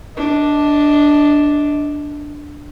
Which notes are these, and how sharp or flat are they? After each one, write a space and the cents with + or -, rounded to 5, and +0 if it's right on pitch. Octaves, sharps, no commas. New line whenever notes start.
D4 +0 D#5 +25